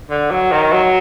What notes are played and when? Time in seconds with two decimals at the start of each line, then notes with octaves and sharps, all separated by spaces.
0.10 D3
0.31 F#3
0.52 D#3
0.73 F#3